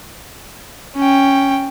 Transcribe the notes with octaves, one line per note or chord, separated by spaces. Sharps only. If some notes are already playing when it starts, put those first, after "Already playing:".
C#4 G5